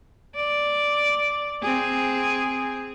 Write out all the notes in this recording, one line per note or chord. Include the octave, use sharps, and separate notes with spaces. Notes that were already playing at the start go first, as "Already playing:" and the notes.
D5
C4 G#4